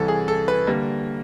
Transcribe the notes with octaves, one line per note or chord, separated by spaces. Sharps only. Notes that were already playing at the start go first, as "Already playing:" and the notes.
Already playing: C2 C3 E3 A4
G#4
A4
B4
D3 G3 A#3